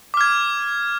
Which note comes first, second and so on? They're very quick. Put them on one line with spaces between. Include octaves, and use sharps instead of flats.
D6 F6 G#6